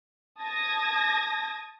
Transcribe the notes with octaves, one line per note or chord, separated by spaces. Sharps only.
A5 D#6 G#6 A#6